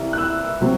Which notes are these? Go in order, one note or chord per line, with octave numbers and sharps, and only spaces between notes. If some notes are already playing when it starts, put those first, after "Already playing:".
Already playing: C2 C3 E3
F#6
E6
C3 F#3 C4